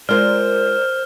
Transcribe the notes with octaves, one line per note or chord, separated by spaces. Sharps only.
G#3 F4 A#4 C5 D5 F6